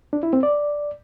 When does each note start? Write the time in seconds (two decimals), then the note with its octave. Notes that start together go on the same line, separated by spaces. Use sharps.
0.13 D4
0.23 E4
0.33 C4
0.43 D5